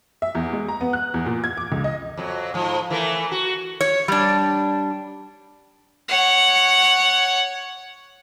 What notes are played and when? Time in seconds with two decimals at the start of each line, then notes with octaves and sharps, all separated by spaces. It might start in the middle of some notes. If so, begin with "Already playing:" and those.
0.22 E5
0.35 E2
0.53 G#3
0.68 A#5
0.81 B3
0.93 F#6
1.14 E2
1.26 A#2
1.44 G#6
1.57 D6
1.72 C#2
1.84 D#5
2.17 F2 F#3
2.54 G#2 F3
2.90 E3 A3 A#4
3.31 F#4
3.81 C#5
4.08 G3 D4
6.08 C#5 F#5